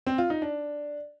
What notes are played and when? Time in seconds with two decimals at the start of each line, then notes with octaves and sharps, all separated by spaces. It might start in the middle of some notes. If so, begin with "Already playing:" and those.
0.07 C4
0.18 F4
0.30 D#4
0.42 D4